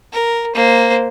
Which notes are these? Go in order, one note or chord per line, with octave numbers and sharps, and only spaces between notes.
A#4
A#3 C5